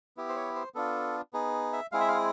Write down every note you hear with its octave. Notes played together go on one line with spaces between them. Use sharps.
B3 E4 G4
C5
C#5
C5
B3 D4 F4 A4
B3 D#4 G#4
E5
G#3 C4 E4 G#4 F5
E5
F5